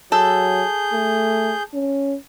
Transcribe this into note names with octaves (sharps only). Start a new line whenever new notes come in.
F#3 G#4 A4 G6
A3
C#4